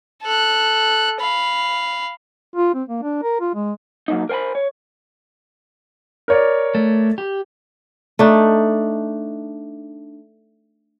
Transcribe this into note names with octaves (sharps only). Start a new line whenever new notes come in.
A4 F#6
F5 B5
F4
C4
A#3
D4
A#4
F4
G#3
F#3 A#3 D#4
A#4 C5 G5 G#5 B5
C#5
A#4 C#5 D5
A3
G4
A3 D4 D#4